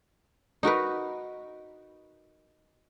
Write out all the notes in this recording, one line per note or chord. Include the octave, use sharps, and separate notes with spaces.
D#4 F#4 A#4 B4